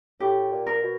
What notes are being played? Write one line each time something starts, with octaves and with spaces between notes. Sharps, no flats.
A2 G4
A#2
A#4
B2